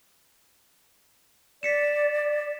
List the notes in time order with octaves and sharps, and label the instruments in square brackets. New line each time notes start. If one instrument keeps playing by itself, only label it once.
[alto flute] D5 [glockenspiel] B6 C#7 E7